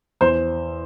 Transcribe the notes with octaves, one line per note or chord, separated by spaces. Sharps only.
E2 C5